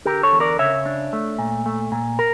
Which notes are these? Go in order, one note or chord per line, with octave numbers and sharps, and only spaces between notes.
D3 G4 A#4
A4 C#5
E2
A#4 D5
C#3 C#5 E5
D4
A3
A#2
A3
A#2
A#4